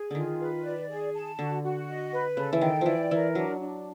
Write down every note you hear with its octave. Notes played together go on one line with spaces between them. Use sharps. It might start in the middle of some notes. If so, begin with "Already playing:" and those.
Already playing: G#4
D3 D#3 F4
B4
D5
G#4
A5
D3 F#4
F#4
D#5
B4
C#3 A4
E3
D#3 G5
E3 F3 D5
E3 A#4
F#3 D4
D4